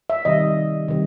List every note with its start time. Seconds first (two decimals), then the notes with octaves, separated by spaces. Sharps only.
0.10 E5
0.25 C3 D#3 G3 D#5
0.88 C3 D#3 G3